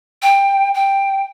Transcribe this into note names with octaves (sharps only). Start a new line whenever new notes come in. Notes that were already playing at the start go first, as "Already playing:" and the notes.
G5
G5